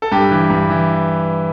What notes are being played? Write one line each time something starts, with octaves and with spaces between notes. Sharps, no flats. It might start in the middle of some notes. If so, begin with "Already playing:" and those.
A4
G2 G4
E3
G2
E3